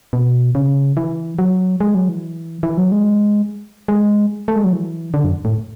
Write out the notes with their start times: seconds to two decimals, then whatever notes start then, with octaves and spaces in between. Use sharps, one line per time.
0.13 B2
0.55 C#3
0.97 E3
1.39 F#3
1.81 G#3
1.95 F#3
2.08 E3
2.63 E3
2.77 F#3
2.92 G#3
3.88 G#3
4.48 A3
4.56 G#3
4.64 F#3
4.72 E3
5.14 D3
5.24 F#2
5.45 A2